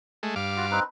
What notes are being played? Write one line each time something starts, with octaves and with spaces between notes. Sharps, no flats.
G#3 A3
G2 F5 D6
F4 F#4
C4 D#4 B4